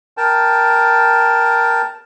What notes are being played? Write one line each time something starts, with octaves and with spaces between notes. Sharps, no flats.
A#4 G5 A5